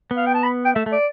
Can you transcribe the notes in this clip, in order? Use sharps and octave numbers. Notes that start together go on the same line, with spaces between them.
B3
F5
G5
A5
B5
G5
A3 E5
A3
D5